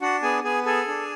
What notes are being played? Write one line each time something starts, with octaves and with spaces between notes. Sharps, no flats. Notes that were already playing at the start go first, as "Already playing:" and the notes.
D4 F#4 F#5
B3 G#4 G#5
B3 G#4 G#5
G#4 A4 G#5
D4